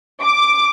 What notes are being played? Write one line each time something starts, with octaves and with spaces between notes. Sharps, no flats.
D6